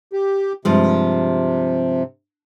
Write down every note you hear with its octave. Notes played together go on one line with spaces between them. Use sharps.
G4
G2 C3 F3 G#3